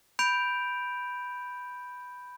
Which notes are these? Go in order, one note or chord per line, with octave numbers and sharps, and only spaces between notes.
B5 G6 D7 F7